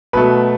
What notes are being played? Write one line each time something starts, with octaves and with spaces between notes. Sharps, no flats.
B2 F#3 A3 B4